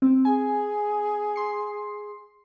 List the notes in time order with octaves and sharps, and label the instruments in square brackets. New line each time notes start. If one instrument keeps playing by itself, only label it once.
[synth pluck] C4
[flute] G#4 [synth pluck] G#5
[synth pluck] C6 C7